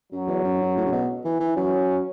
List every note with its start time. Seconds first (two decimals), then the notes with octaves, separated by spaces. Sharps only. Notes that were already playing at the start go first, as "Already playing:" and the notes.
0.12 F#2 F#3
0.28 E2
0.44 F#2
0.60 F#2
0.77 A2
0.85 C#3
0.92 B2
1.24 E3
1.40 E3
1.56 F#3 C#4